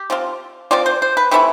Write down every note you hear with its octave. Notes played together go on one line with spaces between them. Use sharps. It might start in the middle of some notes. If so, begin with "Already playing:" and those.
Already playing: G4
F3 C4 F4
F3 C4 F4 D5
C5
C5
B4
C3 E3 A3 E4 B4